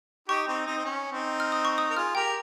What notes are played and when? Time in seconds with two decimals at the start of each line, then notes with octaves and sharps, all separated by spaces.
0.28 D#4 G4 C#6
0.47 C4 D#4
0.66 C4 D#4
0.77 C4
0.85 C#4
1.12 C4 D#4
1.40 F6
1.52 D#6
1.65 C#6
1.78 D#6
1.91 A#4
1.96 F4 G#4 F6
2.15 G4 A#4 G5